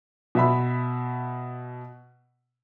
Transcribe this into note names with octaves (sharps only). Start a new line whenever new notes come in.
B2 E5 B5